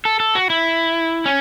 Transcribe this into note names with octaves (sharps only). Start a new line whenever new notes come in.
A4
A4
F#4
E4
C#4